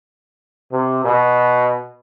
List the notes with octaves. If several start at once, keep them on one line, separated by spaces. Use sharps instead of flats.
C3
B2